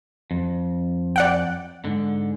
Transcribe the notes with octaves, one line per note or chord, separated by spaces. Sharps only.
F2
D5 F#5 G5
G#2 D3